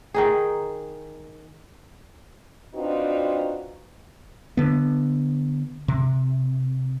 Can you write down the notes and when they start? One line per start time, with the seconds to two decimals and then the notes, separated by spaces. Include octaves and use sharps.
0.14 D#3 D#4 G#4
2.74 C4 D4 D#4 F4 F#4 B4
4.57 D3 B3
5.88 C3